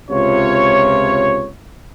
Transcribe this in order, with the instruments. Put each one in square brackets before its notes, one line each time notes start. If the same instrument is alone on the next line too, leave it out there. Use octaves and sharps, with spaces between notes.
[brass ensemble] C#2 C3 F4 C#5